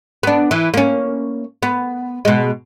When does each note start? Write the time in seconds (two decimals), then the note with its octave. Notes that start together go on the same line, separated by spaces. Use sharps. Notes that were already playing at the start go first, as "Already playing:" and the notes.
0.23 B3 D4
0.51 E3
0.74 A#3 C#4
1.62 B3
2.25 B2 G#3